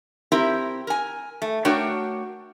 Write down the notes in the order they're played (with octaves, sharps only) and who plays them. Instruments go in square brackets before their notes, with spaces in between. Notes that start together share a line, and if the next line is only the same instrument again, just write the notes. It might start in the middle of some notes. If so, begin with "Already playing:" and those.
[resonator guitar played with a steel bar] C4 E4 G4 A#4
A#4 G#5
A3
A3 D4 F#4 A#4 C#5 G5